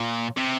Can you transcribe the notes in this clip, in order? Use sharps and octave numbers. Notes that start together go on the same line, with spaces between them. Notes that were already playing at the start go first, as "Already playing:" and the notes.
Already playing: A#2
C3